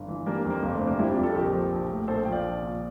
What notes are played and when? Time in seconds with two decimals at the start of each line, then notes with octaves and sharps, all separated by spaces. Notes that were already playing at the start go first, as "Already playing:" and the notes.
Already playing: G1
0.08 E3
0.26 G3 A#3 D4
0.38 A#3
0.45 F2
0.50 A#3
0.63 G1 A#3
0.75 A3 C4
0.81 C3
0.87 A#3 D4
0.99 G3 C4 E4
1.11 D4 F4
1.17 F2
1.23 F4 A4
1.35 A#1 G4 A#4
1.53 F3
1.72 A#1
1.90 A2
2.08 A#1 A4 C5
2.25 F3 G5
2.32 D5 F5
2.44 A#1
2.62 A#2